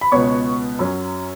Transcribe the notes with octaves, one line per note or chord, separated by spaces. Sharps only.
B5
C#2 B2 B3 C#5 C#6
F#2 F#3 C#4